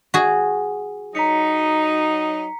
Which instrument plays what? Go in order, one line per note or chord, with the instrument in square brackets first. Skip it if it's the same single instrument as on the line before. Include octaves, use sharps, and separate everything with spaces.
[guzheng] F#4 G#4
[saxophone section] F#3 D#4 [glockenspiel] A#5 B6 C#7